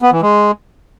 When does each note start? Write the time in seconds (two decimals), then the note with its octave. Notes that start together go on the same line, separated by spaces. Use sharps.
0.02 B3
0.12 E3
0.22 G#3